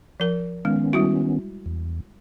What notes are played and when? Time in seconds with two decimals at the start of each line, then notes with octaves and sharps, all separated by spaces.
0.20 F3 A#4
0.65 D#3 G#3 B3 C#4
0.93 G3 E4 F#4
1.66 E2